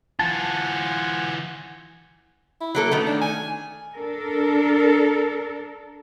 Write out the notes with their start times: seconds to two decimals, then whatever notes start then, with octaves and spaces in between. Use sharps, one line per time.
0.19 E3 F4 F#5 G#5 A5
2.61 E4
2.75 F#3 A#3 A4
2.91 D#3 A3 B3 C#4
3.07 D4
3.22 G#5
3.94 D4 A4 A#4